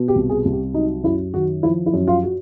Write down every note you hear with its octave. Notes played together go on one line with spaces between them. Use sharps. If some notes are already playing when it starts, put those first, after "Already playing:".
Already playing: B2
G4
C2
G#4
C2
G4
F#3 D#4
F#2 E4
D#3 F#4
F3 E4
E4
F#2
F4
F#4